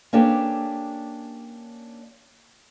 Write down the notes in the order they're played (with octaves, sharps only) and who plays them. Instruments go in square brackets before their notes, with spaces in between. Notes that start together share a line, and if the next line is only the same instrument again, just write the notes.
[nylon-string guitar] A#3 C#4 D4 G4 A4 B4